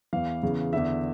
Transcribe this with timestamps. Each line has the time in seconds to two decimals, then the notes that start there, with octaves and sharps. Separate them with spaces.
0.13 E2 E3 F5
0.43 E2 C#3 E3
0.73 E2 D3 E5